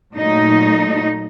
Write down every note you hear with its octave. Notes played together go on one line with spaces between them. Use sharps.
A#2 F#3 A3 D#4